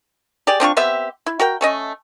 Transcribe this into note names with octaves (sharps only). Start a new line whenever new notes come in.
G4 G#4 D5
C4 D4 F4 C#6
B3 C4 G4 E5
E4
F#4 A#4 G5
A3 C#4 D#5